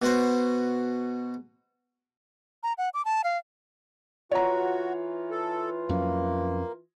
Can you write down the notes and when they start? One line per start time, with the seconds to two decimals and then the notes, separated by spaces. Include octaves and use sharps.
0.02 B2 F#4 C5
2.63 A#5
2.78 F#5
2.94 D6
3.05 A5
3.24 F5
4.31 E3 F4 F#4 C#5 A#5
5.31 A4
5.89 F2 F#3 A#3 C#4